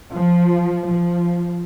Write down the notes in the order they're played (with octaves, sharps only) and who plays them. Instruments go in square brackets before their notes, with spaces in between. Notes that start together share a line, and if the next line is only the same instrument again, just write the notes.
[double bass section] F3
F3